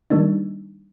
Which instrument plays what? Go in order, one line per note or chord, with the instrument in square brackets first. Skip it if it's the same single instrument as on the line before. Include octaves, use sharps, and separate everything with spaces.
[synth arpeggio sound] D#3 G3 A#3 D4 D#4